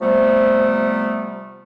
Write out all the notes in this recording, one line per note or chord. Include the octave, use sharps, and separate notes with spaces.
C3 F3 G3 A3 B3